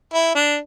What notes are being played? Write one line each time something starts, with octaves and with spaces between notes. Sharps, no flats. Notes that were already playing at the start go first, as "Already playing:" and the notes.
E4
D4